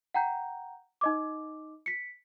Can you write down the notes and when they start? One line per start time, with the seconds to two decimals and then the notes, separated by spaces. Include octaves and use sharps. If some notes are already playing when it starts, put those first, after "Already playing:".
0.14 F#5 G5 A#5 G6
1.01 D#4 D#5 D6
1.86 B6 C#7